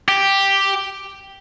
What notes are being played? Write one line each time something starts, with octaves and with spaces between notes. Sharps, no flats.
G4